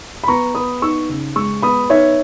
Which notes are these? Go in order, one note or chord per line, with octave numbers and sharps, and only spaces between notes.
B5
B3 A#5 C#6
B3 B5 D#6
D#4 C#6 E6
C#3
G#3 C#6 E6
B3 B5 D#6
D#4 C#5 E5